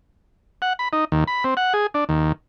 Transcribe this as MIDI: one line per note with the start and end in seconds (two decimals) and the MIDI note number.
0.62 0.73 78
0.79 0.88 83
0.93 1.05 63
1.12 1.24 39
1.27 1.44 83
1.44 1.54 60
1.57 1.73 78
1.73 1.87 68
1.94 2.04 62
2.09 2.32 39